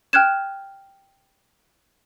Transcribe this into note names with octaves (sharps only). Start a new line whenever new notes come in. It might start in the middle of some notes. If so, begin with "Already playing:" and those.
G5 F6 F#6 G#6 E7